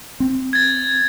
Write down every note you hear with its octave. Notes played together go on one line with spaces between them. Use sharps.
C4
G#6 A6